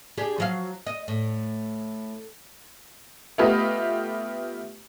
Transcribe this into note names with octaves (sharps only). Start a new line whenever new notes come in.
D4 G4 G#4
F3 F#3 F5
D#5
A2
A3 B3 F4 G4 B4 D#5